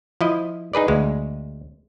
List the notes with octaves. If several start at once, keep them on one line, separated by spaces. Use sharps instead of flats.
F3 E4 D#5
D#4 G#4 B4 D5
D2 G#3